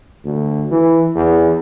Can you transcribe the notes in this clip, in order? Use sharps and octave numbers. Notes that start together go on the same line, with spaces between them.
D2
E3
E2